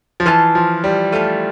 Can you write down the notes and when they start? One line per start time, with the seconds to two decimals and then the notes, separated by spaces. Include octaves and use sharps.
0.20 F3
0.26 E3 F4 C5 F5 A5
0.55 F3
0.84 G3
1.12 A3 F4 C5 F5 A5